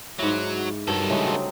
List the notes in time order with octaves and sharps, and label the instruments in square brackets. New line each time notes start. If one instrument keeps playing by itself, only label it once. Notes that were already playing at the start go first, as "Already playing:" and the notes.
[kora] G#2 E4 [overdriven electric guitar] F#3
[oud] G2 [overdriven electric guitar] D#3 A4 [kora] F#3
[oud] C#3 [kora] E3 G#3 A3
[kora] F#3 C4 D#4